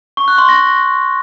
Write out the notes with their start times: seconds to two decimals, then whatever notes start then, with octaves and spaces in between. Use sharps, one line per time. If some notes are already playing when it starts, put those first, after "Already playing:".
0.17 C#6
0.28 F#6
0.38 C6
0.49 A#6